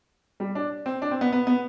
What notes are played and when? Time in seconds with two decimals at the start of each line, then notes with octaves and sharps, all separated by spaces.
0.40 G3
0.55 D4
0.86 C4
1.02 D4
1.11 C4
1.21 B3
1.32 B3
1.47 B3